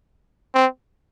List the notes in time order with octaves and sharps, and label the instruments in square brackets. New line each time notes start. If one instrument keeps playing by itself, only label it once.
[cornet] C4